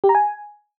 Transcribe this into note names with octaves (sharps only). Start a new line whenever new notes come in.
G4
A#5
G#5